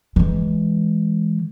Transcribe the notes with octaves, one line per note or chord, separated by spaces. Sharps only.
E3 G#3